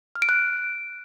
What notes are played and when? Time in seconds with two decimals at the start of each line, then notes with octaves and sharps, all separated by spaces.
0.15 F6
0.22 D7
0.29 F#6